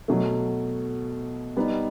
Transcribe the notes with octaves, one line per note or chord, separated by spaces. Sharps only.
B2 F#3 A3
G3 B3 D#4